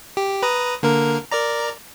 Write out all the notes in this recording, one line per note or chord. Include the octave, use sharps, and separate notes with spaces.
G4
B4 A#5 D#6
D3 A#3 A#4
A#4 D5 A#5